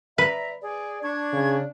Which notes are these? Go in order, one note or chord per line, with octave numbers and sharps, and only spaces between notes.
B4 D5 E5 A#5
G#4 D5
D4 C#6 G#6
C#3